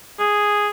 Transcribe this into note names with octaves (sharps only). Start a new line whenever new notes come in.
G#4